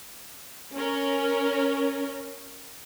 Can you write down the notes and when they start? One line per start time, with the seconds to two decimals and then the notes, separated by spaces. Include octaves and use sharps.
0.75 C#4 A#4